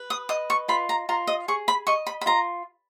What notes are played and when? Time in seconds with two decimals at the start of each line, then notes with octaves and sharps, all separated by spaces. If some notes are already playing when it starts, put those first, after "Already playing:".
Already playing: B4
0.10 D#6
0.29 D#5 D#6
0.50 C#6
0.68 F4 B5
0.89 A#5
1.09 F4 A#5
1.27 D#5
1.48 G#4 C#6
1.68 B5
1.87 D#5 C#6
2.07 B5
2.21 B5
2.26 F4 A#5